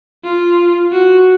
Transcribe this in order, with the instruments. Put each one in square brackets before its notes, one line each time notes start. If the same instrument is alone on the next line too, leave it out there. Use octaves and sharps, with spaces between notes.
[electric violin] F4
F#4